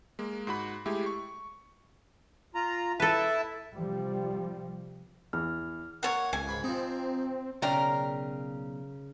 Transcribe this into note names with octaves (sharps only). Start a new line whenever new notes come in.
G#3 A#3
G#2 F#4 B5
G#3 A3 E4 G4
C#6
F4 A#5
E4 A4 B4 E5 A5
C3 F3 G3
E2 F6
A#3 C#5 F#5
C#2 G#5
G#2 B5
F3 C4 D#4
B1 C#3 A#4 D5 G5 A#5